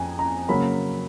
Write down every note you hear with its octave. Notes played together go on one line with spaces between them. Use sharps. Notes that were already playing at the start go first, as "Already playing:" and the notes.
Already playing: F2 G#5 A#5
A#5
C#3 F#3 A#3 B5